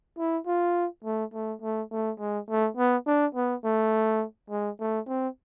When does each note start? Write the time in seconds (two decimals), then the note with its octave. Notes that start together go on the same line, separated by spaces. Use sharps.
0.18 E4
0.46 F4
1.04 A3
1.34 A3
1.62 A3
1.91 A3
2.19 G#3
2.49 A3
2.77 B3
3.06 D4
3.35 B3
3.64 A3
4.50 G#3
4.80 A3
5.08 C4